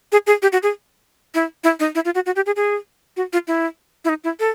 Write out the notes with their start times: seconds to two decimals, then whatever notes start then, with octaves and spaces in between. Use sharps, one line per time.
0.12 G#4
0.27 G#4
0.42 G4
0.52 F#4
0.63 G#4
1.35 E4
1.64 E4
1.80 D#4
1.95 E4
2.05 F4
2.15 F#4
2.26 F#4
2.36 G4
2.46 G#4
2.56 G#4
3.17 F#4
3.33 F4
3.48 E4
4.05 E4
4.09 D#4
4.24 E4
4.40 A4